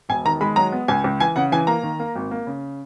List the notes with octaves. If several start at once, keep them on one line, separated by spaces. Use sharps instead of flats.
E1 G#5
D#3 A#5
G#3 B5
F#3 A#5
B3
C#2 G#5
C#2
E3 G#5
C#3 F#5
E3 G#5
A#3 A#5
D#3
A#3
G#1
A#3
C#3